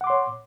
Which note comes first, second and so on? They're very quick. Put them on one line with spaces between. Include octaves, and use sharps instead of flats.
F#5 D6 C6 C#5